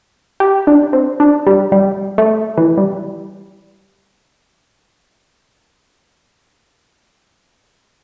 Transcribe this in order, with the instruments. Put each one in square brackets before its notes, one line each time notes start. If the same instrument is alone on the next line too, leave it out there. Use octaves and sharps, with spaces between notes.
[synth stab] G4
D4
C4
D4
G3
G3
A3
E3
G3